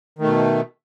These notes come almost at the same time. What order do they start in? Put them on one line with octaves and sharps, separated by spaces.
D#3 A3 B2